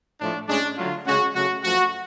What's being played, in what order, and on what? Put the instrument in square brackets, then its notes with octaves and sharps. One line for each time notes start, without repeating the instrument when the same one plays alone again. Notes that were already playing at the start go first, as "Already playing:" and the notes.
[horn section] A2 F3 A3 D4
A2 G#3 C#4 D4
D3 F#3 A3 F4
C#3 G#3 C#4 F#4
C#3 F#3 A3 F#4
F#2 F3 A3 F#4